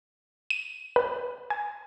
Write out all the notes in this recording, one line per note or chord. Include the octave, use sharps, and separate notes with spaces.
D#7
B4
G#5